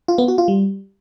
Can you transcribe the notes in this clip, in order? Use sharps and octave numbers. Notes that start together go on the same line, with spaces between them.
F4
B3
F#4
F4
G3